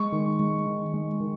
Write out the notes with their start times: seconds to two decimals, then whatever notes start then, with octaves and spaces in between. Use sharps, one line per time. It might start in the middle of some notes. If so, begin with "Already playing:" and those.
Already playing: G#3 C#6
0.12 D#3
0.39 G#3
0.67 D#3
0.94 G#3
1.20 D#3